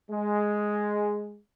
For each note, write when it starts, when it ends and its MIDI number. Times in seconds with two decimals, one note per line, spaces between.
0.11 1.38 56